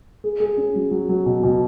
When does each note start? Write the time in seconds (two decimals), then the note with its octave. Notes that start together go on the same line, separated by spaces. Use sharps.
0.24 G#4
0.40 G#4
0.57 C#4
0.75 F#3
0.91 F#3
1.09 F#3
1.26 B2
1.44 B2